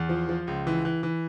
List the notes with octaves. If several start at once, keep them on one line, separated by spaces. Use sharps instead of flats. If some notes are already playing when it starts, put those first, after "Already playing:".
Already playing: E2
F3
F3
C#2
E3
E3
E3